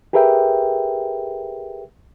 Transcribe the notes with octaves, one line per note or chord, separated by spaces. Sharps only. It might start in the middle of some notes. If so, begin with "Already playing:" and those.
G4 G#4 A#4 B4 E5 G5